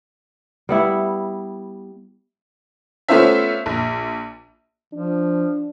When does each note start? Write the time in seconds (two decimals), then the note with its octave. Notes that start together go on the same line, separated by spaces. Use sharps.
0.69 G3 B3 E4
3.08 A3 B3 C#4 F4 C5 E5
3.66 A#1
4.94 F3 D4